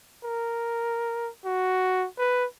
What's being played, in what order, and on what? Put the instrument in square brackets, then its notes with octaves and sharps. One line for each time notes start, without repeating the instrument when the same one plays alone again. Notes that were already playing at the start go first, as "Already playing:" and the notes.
[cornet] A#4
F#4
B4